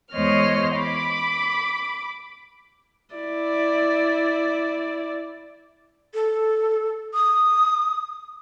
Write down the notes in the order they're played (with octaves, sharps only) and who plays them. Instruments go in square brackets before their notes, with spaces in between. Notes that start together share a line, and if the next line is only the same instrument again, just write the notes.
[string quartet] E2 G#3 C5 C#5 D#5 F6
B5 D6
[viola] E4 D5
[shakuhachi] A4
D#6